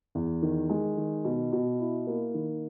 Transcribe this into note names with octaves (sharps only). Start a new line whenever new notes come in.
E2
D#3
G#3
D#3
B2
B2
E4
A#3
D#3